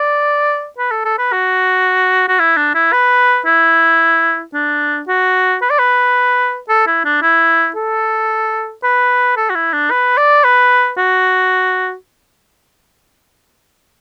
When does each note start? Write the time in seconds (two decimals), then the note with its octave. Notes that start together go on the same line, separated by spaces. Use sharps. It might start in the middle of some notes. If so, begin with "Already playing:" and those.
Already playing: D5
0.78 B4
0.91 A4
1.05 A4
1.19 B4
1.32 F#4
2.28 F#4
2.40 E4
2.57 D4
2.75 E4
2.93 B4
3.46 E4
4.54 D4
5.08 F#4
5.62 B4
5.70 D5
5.79 B4
6.69 A4
6.87 E4
7.05 D4
7.22 E4
7.76 A4
8.84 B4
9.37 A4
9.50 F#4
9.55 E4
9.73 D4
9.91 B4
10.18 D5
10.44 B4
10.98 F#4